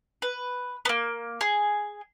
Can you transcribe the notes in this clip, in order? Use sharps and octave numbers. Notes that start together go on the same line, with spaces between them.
B4
A#3 B3
G#4